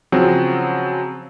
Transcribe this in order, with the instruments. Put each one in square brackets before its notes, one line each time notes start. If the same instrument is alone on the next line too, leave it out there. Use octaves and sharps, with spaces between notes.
[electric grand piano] C#3 F3 F#3 C4 G#4